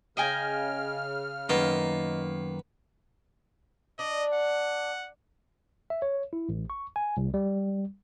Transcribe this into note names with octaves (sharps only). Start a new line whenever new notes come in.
C#3 D#5 G5 G#5 F6
F#2 D#3 A#3 B3 D#5
D4 D#5
F#5
E5
C#5
E4
A1
C#6
G#5
C2
G3